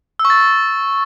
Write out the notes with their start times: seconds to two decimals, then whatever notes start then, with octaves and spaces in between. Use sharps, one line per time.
0.19 E6
0.25 C#6
0.30 A6